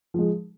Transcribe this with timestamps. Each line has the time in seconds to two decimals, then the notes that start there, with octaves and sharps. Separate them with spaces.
0.14 F3 G#3